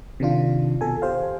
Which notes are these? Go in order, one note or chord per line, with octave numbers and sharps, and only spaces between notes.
C3 D#3 D4 F4
B2 A4 G#5
G4 C5 F5